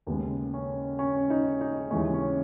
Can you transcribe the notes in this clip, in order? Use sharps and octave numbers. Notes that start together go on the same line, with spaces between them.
D#2 C#3 G#3 B3
C#4
C#4
D#4
D#4
D#2 C#3 E3 G#3 C#4
C#4